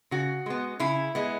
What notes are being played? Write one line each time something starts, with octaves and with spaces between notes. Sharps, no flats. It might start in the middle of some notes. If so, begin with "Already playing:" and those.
C#3 F#4
G#3 B3
C#3 E4
G#3 B3